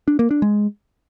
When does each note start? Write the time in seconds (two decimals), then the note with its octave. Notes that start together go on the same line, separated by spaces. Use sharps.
0.08 D4
0.19 A#3
0.31 D4
0.42 G#3